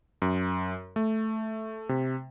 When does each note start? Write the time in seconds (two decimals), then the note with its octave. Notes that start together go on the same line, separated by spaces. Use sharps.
0.22 F#2
0.96 A3
1.89 C3